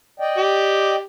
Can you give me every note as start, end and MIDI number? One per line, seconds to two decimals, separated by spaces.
0.20 0.96 74
0.20 0.96 75
0.20 0.96 79
0.37 1.03 67